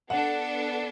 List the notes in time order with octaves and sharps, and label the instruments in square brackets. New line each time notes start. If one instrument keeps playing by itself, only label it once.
[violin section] B3 D4 A4 [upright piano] F#5